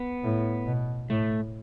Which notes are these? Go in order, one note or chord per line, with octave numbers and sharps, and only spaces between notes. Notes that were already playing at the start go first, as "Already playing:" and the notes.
Already playing: B3
A2
B2
A2 A3